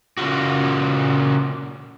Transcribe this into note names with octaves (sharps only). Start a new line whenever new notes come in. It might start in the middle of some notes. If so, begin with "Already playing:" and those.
A#2 C#3 F4 F#4